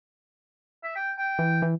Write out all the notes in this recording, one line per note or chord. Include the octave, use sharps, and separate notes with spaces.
E5
G5
G5
E3
E3